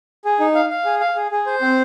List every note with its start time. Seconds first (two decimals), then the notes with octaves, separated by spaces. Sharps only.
0.25 G#4
0.40 D#4
0.55 F5
0.70 F5
0.85 G#4
1.01 F5
1.16 G#4
1.31 G#4
1.46 C5
1.61 C4